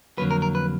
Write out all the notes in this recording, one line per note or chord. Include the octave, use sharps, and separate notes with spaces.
F2 D3 F#3 A#3 B4
A#4
A#4
B4